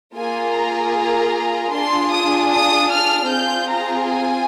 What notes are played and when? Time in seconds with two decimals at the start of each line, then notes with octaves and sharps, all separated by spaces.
0.15 A#3 F4 G#4 G#5
0.54 A#5
0.93 A#5
1.71 D4 F4 G#4 C6
2.11 D#6
2.50 D#6
2.89 F6
3.29 C4 F4 G#4 G6
3.67 A#5
4.07 G#5